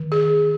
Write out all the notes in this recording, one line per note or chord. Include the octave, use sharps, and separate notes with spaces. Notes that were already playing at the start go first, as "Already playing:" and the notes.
Already playing: D#3
G#4